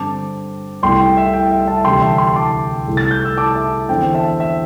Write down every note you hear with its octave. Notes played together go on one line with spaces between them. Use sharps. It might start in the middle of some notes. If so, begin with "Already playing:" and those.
Already playing: G2 D3 C4 A5 D6
C2 C3 A3 E4 G5 C6
G5
E5
G5
E5
E5 A5
D2 C3 E3 G3 G5 C6
E5 A5
G5 C6
A5 D6
C2 C3 A3 E4
A6
G6
E6
A5 D6
E5 A5
E2 D3 C4 E4 G5
E5 A5
E5